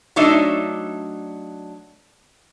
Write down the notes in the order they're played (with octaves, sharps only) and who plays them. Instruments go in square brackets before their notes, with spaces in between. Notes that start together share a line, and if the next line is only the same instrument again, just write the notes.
[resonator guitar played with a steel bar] F#3 A3 D4 D#4 E5